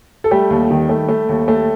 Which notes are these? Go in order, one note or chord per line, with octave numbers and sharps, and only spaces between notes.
A4
G3 A3 G4
D#2
D#3
A3
A3
D#2
A3